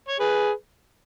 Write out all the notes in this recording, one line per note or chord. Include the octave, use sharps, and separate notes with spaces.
C#5
G#4 B4